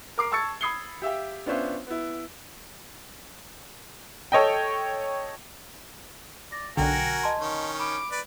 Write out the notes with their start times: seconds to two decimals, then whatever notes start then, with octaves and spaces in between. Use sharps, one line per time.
0.18 A#4 D6 C7
0.32 A5 C#6 E6 G#6 A6 C#7
0.61 B5 D#6 G#6 C7 C#7 G7
1.02 G4 E5 F5 G5
1.46 B3 C#4 D4 F4 C5 E5
1.87 B3 E4
4.32 A4 C#5 D#5 G5
6.52 D5 A#6
6.77 B1 D3 F#4 A#4 G5 G#5
7.23 D#5 A5 C6
7.40 D#3 C#4
7.79 B5 D6
8.11 B4 D5